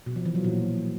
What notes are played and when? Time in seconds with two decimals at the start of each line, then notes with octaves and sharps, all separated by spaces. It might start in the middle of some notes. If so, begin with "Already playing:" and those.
0.06 B2
0.16 F3
0.25 E3
0.35 F#3
0.44 A#2